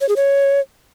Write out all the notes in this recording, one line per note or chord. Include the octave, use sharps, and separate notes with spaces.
C#5
G#4
C#5